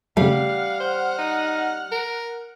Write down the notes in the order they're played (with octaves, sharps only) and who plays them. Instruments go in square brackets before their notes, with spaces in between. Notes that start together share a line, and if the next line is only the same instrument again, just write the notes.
[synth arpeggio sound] C#3 A3 [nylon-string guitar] G3 [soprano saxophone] F5 [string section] F#5 F6
[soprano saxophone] C5
D#4
A#4